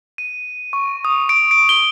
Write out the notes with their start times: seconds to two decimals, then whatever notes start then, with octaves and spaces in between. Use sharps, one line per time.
0.18 D#7
0.73 C#6
1.05 D#6
1.29 D7
1.51 D7
1.69 G7